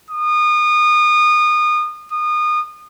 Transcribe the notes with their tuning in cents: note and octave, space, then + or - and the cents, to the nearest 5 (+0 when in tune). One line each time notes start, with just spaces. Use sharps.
D#6 -30
D#6 -30